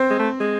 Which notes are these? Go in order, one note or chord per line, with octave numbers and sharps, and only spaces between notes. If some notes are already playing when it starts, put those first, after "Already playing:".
Already playing: C4 C5
G#3
A3
G#3